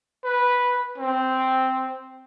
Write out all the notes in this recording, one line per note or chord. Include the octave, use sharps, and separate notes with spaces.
B4
C4